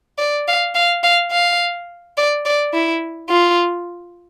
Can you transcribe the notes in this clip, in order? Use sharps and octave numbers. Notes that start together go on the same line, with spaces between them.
D5
F5
F5
F5
F5
D5
D5
E4
F4